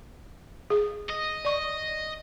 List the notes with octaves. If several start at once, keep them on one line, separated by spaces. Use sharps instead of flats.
G#4
D#5
D5 C#6